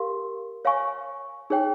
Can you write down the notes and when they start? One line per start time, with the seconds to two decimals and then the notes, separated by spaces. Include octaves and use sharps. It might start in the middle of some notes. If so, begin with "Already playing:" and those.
Already playing: G4 A#4 F5 C6
0.65 C#5 F5 G#5 C#6
1.50 D#4 G#4 C#5 G5